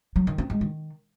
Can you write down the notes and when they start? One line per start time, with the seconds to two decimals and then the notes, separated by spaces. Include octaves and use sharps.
0.16 F#3
0.27 D#3
0.38 C4
0.50 G#3
0.61 D#3